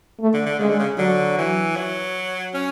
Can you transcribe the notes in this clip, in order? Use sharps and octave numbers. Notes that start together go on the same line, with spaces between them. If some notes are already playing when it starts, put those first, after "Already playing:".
A3
D3
D3
C#3 G#3
D3
C#3
D3 F#3
E3
F#3
C#4